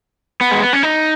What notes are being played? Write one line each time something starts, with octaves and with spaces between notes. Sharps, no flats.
B3
G#3
B3
C#4
D#4